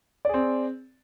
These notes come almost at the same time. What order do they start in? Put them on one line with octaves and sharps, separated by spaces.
D5 G#4 C4